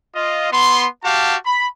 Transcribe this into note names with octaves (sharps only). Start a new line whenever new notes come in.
F4 D#5
B3 C6
F#4 G4 F5 A5
B5